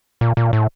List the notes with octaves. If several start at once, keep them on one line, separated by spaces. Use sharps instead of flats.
A#2
A#2
A2